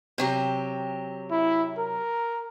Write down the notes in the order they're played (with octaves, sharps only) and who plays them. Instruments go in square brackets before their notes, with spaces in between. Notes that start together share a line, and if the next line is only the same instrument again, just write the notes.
[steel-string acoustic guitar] C3 F#3 G4
[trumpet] E4
A#4